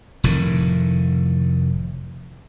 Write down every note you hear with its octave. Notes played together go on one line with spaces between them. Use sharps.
F1 A2 D#3